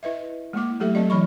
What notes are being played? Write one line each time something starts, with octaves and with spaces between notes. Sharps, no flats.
E4 B4 D#5 E5
G#3 A#3 E4 D6
F#3 A3 G4 A4 E5
F#3 C4 E4 D5 D#5
E3 F#3 B5 C#6